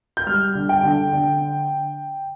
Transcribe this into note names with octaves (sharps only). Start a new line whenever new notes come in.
G6
G3 F6
D3
G5
D3
D3